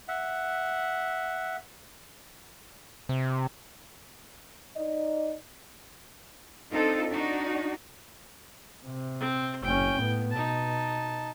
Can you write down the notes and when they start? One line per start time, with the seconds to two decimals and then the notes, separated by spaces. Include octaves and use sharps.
0.08 E5 F#5
3.09 C3
4.76 D#4 D5 D#5
6.71 C4 D4 D#4 F4 A4
7.11 D4 D#4 F#4
8.85 C3
9.20 C4
9.64 F#1 C#4 G5
10.00 A2 B3
10.31 B2 D#4 A5